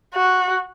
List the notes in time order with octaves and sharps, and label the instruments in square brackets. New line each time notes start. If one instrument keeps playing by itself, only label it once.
[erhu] F#4